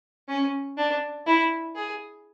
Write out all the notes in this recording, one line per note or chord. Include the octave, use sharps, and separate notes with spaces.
C#4
D4
E4
G#4